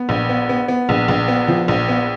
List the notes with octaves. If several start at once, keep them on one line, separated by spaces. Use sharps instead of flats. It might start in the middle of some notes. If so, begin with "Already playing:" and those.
Already playing: B3
A#1
B3
B3
B3
A#1
A#1
B3
F3
A#1
B3